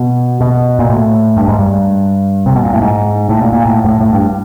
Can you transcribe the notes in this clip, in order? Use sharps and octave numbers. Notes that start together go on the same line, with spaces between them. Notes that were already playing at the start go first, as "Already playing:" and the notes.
Already playing: B2
B2
A#2
A2
G2
G#2
G2
C3
B2
A#2
A2
G#2
A2
A#2
A#2
A2
G#2
A2
A2
G2